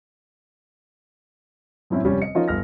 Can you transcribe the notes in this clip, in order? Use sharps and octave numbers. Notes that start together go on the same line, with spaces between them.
F#2 A2 C4 C#4 E4
F1 G3 C#4 C#5
D#5 C#7
F3 C#4 D#4 F4 A#4 D#5
G1 F6 A#6